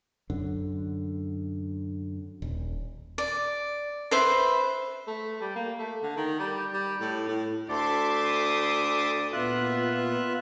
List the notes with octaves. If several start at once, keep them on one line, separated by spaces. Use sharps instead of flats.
F#2 D3
D#1
D5
B4 C5 E5
A3
G3
A#3
A3
D3
D#3
G3
G3
A2
A2
D2 A4 D5 E5 C6 D6
D#6
A#2 B3 F4 E5 F#6